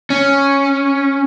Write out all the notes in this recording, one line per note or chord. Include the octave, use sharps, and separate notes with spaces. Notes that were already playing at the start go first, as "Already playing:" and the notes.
C#4